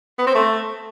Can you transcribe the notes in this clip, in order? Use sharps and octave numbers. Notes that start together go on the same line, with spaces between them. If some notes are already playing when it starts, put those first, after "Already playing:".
B3
C4
A3